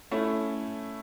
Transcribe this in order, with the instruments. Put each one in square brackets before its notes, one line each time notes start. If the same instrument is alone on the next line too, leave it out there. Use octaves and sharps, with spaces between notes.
[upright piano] A3 C#4 E4